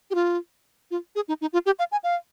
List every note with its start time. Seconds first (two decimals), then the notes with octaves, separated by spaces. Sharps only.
0.11 G4
0.15 F4
0.91 F4
1.16 G#4
1.28 D#4
1.41 D#4
1.53 F4
1.66 G4
1.79 F5
1.92 G#5
2.04 F5